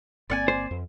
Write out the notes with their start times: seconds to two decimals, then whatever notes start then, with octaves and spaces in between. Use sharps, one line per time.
0.30 G1 A#3 C4 D5 F#5 G#5
0.48 C5
0.71 F2